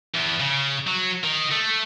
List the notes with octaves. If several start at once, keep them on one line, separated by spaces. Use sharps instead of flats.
E2
C#3
F#3
D#3
A3